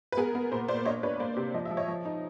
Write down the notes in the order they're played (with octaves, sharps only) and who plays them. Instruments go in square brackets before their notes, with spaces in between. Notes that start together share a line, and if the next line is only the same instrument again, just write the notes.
[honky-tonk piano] B4
B3 G#4 A#4
B3
A#2 A#4 C5
A#2 C5 D5
D4 C#5 D#5
D4 B4 C#5
C#5
A#3 C5 D5
C3
F3 D#5
E5
F3
C#5 D#5
F3
D#4